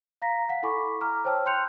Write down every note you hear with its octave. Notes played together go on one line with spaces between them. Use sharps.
F5 A#5 A#6 B6
F5 F#5 B6
E4 A4 G#5 B5 C#6 D6
A#5 D6 F6
C5 C#5 G5 A5 E6 F6
G5 C6 F#6 G6 C#7 F7